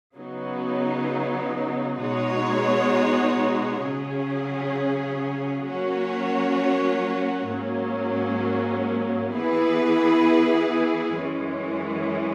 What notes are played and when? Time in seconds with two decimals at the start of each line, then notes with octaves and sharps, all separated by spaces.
0.16 C#3 F#3 B3 D#4
2.01 B2 G#3 D#4 F#4 C#5
3.83 C#3 F#3 C#4 G#4
5.67 F#3 A#3 C#4 F#4 C#5
7.50 G#2 F#3 A#3 C#4
9.35 E3 B3 E4 G#4 B4
11.18 F#2 E3 G#3 C#4